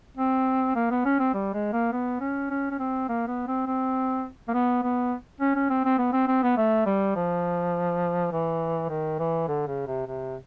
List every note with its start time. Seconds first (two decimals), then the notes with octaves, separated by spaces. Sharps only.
0.17 C4
0.76 A#3
0.91 B3
1.05 C#4
1.19 C4
1.34 G3
1.54 G#3
1.73 A#3
1.92 B3
2.21 C#4
2.50 C#4
2.71 C#4
2.79 C4
3.08 A#3
3.28 B3
3.47 C4
3.67 C4
4.48 A#3
4.54 B3
4.83 B3
5.41 C#4
5.55 C#4
5.70 C4
5.85 C4
5.99 B3
6.13 C4
6.28 C4
6.43 B3
6.57 A3
6.86 G3
7.16 F3
8.32 E3
8.89 D#3
9.19 E3
9.48 D3
9.67 C#3
9.87 C3
10.06 C3